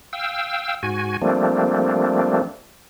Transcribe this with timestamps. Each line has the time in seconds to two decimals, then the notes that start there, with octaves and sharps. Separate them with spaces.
0.13 F5 G5 E6
0.83 G#2 F#4 G#5
1.22 F3 G3 A3 A#3 C4 D4